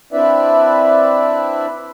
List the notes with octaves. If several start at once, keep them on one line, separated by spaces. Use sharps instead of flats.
C4 D4 E4 B4 D5 E5